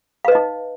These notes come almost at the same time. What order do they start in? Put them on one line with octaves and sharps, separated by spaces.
F5 B4 D#5 D#4